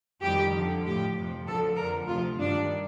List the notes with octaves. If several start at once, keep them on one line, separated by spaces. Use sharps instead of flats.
F2 D#3 G3 G4
F2 D3 F3
A2 F3 G4
F2 C3 F3
D2 D3 F3 A4
F2 D3 F3 A#4
D2 C3 F3 F4
G2 D#3 G3 D4